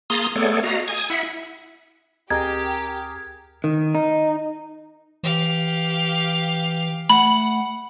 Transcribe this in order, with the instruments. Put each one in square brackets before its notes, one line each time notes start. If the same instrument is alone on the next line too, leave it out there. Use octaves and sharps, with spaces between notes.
[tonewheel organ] A#3 G#4 A#5 C6 D#6 A6
A3 B3 G#4 A4 C#5 D5
F#4 D#5 F5 A#5
G#5 D#6 G#6
E4 E5 F#5
[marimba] D2 [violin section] G4 [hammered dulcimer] G#4 A#4 [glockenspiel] G#6
[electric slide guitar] D#3
D#4
[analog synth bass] E3 [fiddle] G4 F5
[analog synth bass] A3 [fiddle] F#5 [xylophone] B5